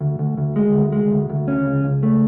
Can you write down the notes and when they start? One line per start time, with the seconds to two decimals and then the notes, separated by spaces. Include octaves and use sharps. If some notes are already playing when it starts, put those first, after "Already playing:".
0.01 D2
0.19 D2
0.38 D2
0.56 G#3
0.74 D2
0.92 G#3
1.11 D2
1.29 D2
1.48 C#4
1.66 C#2
1.84 C#2
2.03 A3